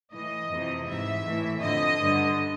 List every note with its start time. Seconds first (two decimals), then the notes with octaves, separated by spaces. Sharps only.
0.12 A2 E3 D#5
0.49 F2 C3 E3
0.87 G#2 E3 E5
1.24 A2 E3
1.61 F2 D3 D#5
1.98 G2 D3